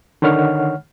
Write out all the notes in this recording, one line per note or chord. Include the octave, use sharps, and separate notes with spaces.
D3 D#3 C#5 F#5 F6